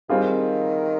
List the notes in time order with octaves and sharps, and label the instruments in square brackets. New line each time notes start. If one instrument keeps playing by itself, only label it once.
[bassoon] D#3 [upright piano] G3 C4 F4 G#4